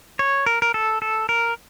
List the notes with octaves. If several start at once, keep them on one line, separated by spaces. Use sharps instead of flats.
C#5
A#4
A#4
A4
A4
A#4